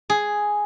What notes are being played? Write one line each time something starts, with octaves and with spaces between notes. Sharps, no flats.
G#4